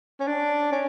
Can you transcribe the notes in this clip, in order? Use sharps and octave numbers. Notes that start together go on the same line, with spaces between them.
C#4
D4
C#4